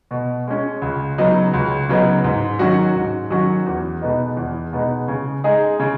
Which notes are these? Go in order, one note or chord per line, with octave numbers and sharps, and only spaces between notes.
B2
G#3 C#4
C#2
C#3 F#3 B3 D#4
C#2
C#3 F#3 B3 D#4
G#2
D#3 F#3 C#4 F#4
G#2
D#3 F#3 C#4 F#4
E2
B2 G#3 B3 D#4
E2
B2 G#3 B3 D#4
C#3
G#3 D#4 G#4
C#3